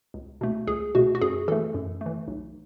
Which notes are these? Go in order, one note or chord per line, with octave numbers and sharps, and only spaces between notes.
C#2
B2 A3
C#2 G#4
B2 A3 F#4
F#4
F#2 G#4
E3 A3 A4
F#2
E3 A3
B1